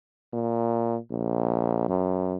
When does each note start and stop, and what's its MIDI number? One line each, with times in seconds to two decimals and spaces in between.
0.33 0.98 46
1.11 1.88 34
1.89 2.37 42